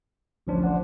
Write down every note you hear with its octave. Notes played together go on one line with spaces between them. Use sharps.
A1 D2 F3 C#4 D4 C5
C5 D5 F#5